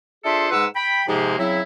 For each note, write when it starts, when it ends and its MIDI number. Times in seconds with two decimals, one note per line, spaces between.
0.25 0.50 62
0.25 0.50 65
0.25 0.50 68
0.25 0.50 69
0.25 0.50 72
0.25 0.50 76
0.51 0.66 44
0.51 0.66 56
0.51 0.66 71
0.51 0.66 78
0.51 0.66 88
0.76 1.02 79
0.76 1.02 83
1.08 1.35 44
1.08 1.35 48
1.08 1.35 53
1.08 1.35 56
1.08 1.35 58
1.08 1.35 67
1.38 1.60 49
1.38 1.60 54
1.38 1.60 60
1.38 1.60 64